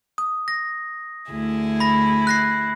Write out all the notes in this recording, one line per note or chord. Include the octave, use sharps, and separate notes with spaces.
D#6
A#6
D2 E4 G#4
B5 A#6
F#6 A#6 C7